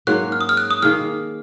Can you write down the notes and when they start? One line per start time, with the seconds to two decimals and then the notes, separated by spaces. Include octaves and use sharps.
0.07 G#2 F#3 A#3 C#4 F#6
0.32 F6
0.41 D#6
0.49 F6
0.57 F#6
0.71 D#6
0.82 D#3 A#3 D#4 G#4 F6